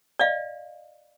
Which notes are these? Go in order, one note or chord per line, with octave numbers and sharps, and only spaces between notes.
D5 D#5 F5